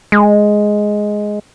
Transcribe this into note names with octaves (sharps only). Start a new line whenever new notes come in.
G#3